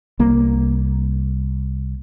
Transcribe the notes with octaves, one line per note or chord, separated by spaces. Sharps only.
C2 A#3